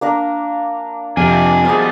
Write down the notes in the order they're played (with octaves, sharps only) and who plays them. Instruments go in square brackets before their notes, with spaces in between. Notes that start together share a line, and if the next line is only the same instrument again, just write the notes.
[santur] A#3 D4 A#4
[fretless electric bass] F2 C3 [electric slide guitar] A#3 D4 [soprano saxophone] G#5
[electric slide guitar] B2 F3 G3 [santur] G#4 C5